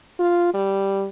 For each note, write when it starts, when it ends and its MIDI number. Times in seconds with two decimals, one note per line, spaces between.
0.19 0.49 65
0.54 1.07 55